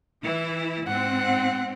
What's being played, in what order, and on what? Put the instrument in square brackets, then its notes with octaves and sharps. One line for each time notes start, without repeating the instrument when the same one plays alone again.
[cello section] E3 E4
[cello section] G#2 C4 [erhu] F#5